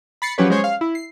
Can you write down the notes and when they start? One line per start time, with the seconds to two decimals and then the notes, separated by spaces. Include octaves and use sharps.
0.22 B5 A6 C7 C#7
0.38 F3 F#3 C#4 G4 B4 C#5
0.50 G#3 C#4 C5 C#5
0.64 F5
0.81 E4
0.95 C7